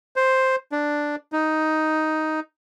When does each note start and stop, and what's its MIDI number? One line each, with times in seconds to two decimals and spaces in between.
0.16 0.56 72
0.72 1.16 62
1.32 2.40 63